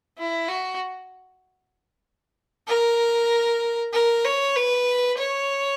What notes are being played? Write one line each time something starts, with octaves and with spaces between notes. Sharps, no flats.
E4
F#4
A#4
A#4
C#5
B4
C#5